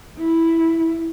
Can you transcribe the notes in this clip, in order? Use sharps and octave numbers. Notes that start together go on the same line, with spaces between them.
E4